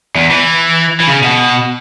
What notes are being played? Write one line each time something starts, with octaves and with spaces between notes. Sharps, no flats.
E2
E3
E3
C#3
B2